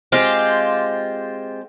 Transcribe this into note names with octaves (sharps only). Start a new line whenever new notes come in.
G#3 C4 F4 G4